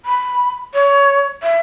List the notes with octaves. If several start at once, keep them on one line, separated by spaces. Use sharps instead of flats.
B5
C#5
E5